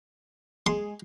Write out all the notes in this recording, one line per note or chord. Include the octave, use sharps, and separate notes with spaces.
G#3 G#4 C6